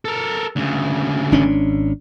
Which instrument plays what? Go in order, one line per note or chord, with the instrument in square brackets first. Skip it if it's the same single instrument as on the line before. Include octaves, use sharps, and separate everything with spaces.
[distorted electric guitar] A4 A#4
D2 C#3
[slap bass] G#1 C#4 D4